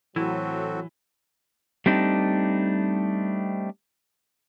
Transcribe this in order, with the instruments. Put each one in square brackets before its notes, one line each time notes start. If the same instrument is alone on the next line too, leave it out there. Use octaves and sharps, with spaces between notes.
[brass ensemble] A2 F#3 [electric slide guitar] E3 [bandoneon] C4 F#4 A4 [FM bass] E4
[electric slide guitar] G3 A3 C4 D4 D#4